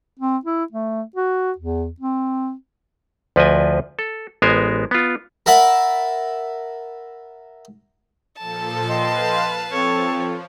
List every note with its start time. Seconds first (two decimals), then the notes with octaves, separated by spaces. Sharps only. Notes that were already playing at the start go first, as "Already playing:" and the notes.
0.20 C4
0.45 E4
0.72 A3
1.16 F#4
1.58 E2
2.00 C4
3.36 D2 F3 B4 D5 D#5 G#5
3.99 A4
4.42 A1 G#3 B3 A#4 C5 G#5
4.91 B3 F4
5.46 A#4 E5 F#5 A5 B5
8.38 A#2 F3 A4 A5
8.89 B4 D#5 F5 G5 C6
9.72 F3 C4 A4 C#5